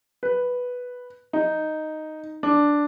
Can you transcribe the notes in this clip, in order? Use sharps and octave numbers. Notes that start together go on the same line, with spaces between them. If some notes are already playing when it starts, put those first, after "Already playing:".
B4
D#4
D4